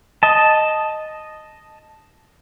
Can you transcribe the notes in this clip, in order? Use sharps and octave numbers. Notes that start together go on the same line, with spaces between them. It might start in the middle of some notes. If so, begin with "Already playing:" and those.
D#5 A5